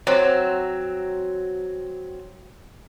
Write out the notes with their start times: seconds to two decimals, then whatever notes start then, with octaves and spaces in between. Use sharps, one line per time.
0.07 F#3 C4 C5 C#5